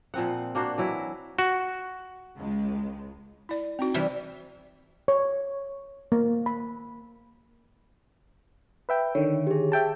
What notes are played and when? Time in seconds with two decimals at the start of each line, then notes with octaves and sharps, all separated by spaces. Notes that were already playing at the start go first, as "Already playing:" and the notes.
0.14 A#2 F3 C4 F#5
0.55 A#3 D4 F#4 C5
0.78 E3 F#3 E4
1.39 F#4
2.39 C#2 G#3
3.49 E4 D5
3.79 C4 D#4 F#4
3.94 C3 E3 G3
5.08 C#5
6.12 A#3
6.46 B5
8.89 B4 E5 G5
9.15 D3 D#3 C#5
9.47 G4 G#4
9.72 E5 G5 A5